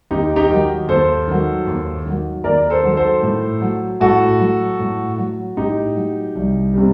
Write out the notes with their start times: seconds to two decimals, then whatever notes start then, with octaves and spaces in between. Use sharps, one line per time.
0.11 D#2 D#4 G4
0.36 D#4 G4
0.49 D#3 F#3
0.88 D#2 A4 C5
1.28 D#3 F#3
1.66 D#2
2.06 D#3 F#3
2.44 D#2 A#4 D5
2.70 A4 C5
2.83 D#3 F#3
2.97 A4 C5
3.23 A2
3.61 F#3
4.00 A2 F#4 A4
4.40 F#3
4.79 A2
5.18 F#3
5.57 A2 D#4 G4
5.96 F#3
6.35 C2
6.73 C3 G3